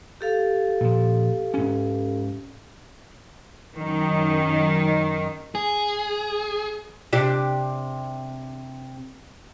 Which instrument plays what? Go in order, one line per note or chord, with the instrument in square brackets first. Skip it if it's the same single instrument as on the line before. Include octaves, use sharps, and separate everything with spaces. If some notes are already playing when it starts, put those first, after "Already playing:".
[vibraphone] G4 A4 F5
[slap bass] A#2 F3
G#2 C#4
[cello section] F#2 D#3
[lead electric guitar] G#4
[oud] C3 D4 G4